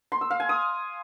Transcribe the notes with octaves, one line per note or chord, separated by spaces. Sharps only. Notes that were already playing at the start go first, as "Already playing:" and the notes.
C6
E6
F5
G#5
D#6